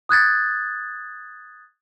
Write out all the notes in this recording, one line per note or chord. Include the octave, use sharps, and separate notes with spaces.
D#6 F#6 G#6 A6